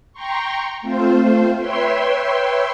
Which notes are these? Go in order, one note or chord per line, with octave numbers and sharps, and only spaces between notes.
G5 A#5 C6 C#6
A3 C4 F4 C5
B4 C#5 E5 G5 C6